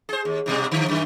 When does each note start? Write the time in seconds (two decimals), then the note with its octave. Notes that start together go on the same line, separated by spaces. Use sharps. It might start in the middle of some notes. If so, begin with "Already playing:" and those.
0.09 G#4 C5
0.25 D#2
0.46 G#2 B2 G3
0.71 D3 F3
0.89 F#2 D#3